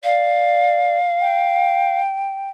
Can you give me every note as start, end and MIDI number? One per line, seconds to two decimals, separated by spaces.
0.04 0.99 74
0.04 2.00 77
1.21 2.50 79